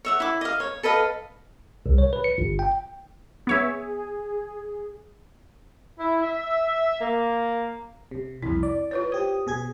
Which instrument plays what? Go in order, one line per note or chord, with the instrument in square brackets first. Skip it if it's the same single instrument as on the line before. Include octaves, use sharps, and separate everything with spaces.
[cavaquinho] C#5 E5 F#5
E4 D6
D#5 F5
C#5
A4 B4 D#5 F5
[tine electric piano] C2
C#5
B4
C#7
G1
G5
[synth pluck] B3 C#5 E5 [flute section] G#4
[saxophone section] E4
E5
A#3
[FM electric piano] C3
[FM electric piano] C2 F2 [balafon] E4
[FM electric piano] D5
[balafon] F4 B4 C#5
[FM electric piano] G4 D#6 [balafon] C5
[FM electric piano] B2 G#4 G#6